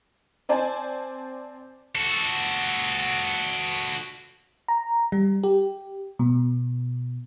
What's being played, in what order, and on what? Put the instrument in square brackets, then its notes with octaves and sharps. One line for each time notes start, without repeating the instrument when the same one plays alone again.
[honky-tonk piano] C4 C5 D5 G#5 A5
[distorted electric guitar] F#4 A4
[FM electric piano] A#5
G3
G4
B2